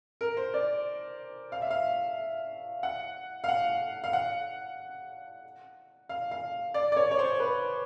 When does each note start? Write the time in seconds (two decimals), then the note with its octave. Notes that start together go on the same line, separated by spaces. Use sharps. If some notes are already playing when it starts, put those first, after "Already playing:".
0.21 A#4
0.37 C5
0.54 D5
1.52 F5
1.62 E5
1.71 F5
2.83 F#5
3.44 F5
3.48 F#5
4.04 F5
4.13 F#5
6.09 F5
6.31 F5
6.74 D5
6.92 D5
6.96 C#5
7.11 C#5
7.19 C5
7.40 B4